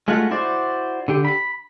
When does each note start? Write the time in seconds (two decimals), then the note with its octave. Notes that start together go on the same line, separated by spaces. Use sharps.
0.08 G#3 A3 F4 F#4 F#5
0.31 E4 F#4 C5 D5
1.08 D3 G4
1.25 B5